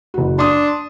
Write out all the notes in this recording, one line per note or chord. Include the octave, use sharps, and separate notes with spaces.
F#1 F#4
D4 C6 D#6